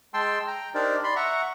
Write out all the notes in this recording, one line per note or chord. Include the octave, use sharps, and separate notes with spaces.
G#3 G5 A5 C6 E6
G5 A#5
D4 D#4 G4 A#4 C5 D5
D5 B5 C6
E5 F#5 A#5 C#6